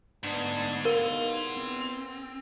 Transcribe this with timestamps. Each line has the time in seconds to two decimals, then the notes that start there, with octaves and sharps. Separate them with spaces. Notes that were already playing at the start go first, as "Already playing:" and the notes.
0.24 D2 G#2 B3 D4 C6
0.85 E2 B3 D#4 A#4 F5 F#5 C6
1.57 C4